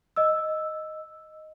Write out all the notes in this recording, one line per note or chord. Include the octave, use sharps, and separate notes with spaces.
D#5 E6